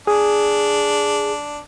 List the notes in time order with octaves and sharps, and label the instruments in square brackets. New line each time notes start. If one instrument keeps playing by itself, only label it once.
[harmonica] D4 [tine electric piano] G#4